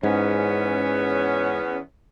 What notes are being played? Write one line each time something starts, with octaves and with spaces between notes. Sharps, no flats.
E2 G#2 B3 C#4